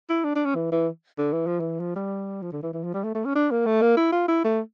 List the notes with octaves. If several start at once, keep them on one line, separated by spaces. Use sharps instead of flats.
E4
D4
D4
C#4
E3
E3
D3
E3
F3
E3
F3
G3
F3
D3
E3
E3
F3
G3
A3
A3
C#4
D4
A#3
A3
A#3
E4
F4
E4
A3